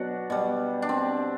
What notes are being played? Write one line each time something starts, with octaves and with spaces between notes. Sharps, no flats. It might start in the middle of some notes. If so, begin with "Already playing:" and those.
Already playing: B2 F#3 D4 F#4
B2 G3
D4
C4